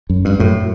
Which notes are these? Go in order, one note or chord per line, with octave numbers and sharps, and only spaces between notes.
F#2
G2
F#2 A2